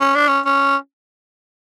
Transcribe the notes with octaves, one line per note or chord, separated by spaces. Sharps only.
C#4
D4
C#4
C#4